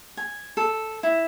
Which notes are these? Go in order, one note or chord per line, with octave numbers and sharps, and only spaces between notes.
G#5
A4
E4